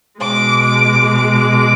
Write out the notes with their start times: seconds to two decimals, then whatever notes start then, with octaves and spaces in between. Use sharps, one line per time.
0.20 B2 G#3 D6
0.64 D6
1.08 D6